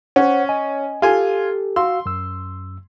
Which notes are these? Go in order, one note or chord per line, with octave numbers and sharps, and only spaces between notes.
C#4 C5 C#5 F#5
D#5 G#5
F4 G4 A4 G#5
F#4 F5 C6 E6
F#2 E6